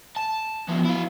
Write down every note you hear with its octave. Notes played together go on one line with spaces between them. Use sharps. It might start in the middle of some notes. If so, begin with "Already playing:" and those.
A5
F3 B3
E4 F5